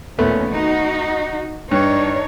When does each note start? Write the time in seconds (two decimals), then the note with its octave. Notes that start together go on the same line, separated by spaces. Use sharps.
0.19 D#2 A#2 A3 B3 C#4
0.50 D#4 F#4
1.71 G2 D4 D#4 C#5